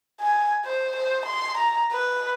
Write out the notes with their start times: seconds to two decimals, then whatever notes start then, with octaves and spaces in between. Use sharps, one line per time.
0.21 G#5
0.65 C5
0.96 C5
1.26 C6
1.58 A#5
1.92 B4